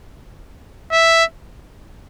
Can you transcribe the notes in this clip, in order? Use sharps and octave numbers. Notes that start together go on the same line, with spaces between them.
E5